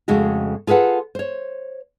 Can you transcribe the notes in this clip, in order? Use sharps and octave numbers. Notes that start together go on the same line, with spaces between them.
F2 C#3 G#3 A3 F#4
F4 G#4 A4 B4 F#5
C5 C#5